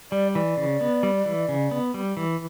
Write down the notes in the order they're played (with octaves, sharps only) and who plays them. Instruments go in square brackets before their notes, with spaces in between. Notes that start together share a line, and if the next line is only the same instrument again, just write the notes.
[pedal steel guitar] G3 [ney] D5
[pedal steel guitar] E3 [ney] D5
[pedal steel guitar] C#3
B3
G3
E3
C#3
B3
G3
E3